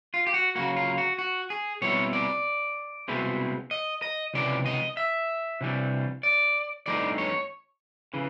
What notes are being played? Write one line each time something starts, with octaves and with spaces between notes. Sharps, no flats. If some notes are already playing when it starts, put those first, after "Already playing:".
F4
G4
F#4
C#3 F#3 A#3 F#4
F4
F#4
F#4
G#4
B2 G3 C4 E4 C#5
D5
C2 B2 G#3 C4 E4
D#5
D#5
C#2 C3 E3 D5
D#5
E5
C3 E3 G3
D5
G2 E3 A3 C4 D#4 D5
C#5
C#3 E3